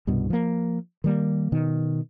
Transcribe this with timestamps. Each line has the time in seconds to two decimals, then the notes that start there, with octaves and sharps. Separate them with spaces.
0.07 C2 G2 B2
0.30 F3 A#3
1.04 D#3 G3 A#3
1.52 B2 D#3